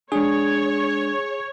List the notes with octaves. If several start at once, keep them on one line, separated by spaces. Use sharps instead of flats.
G#3 D4 G#4 C#5